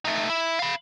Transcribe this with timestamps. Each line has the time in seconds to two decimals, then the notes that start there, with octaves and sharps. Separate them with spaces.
0.05 A3 D#4
0.29 E4
0.59 F5 B5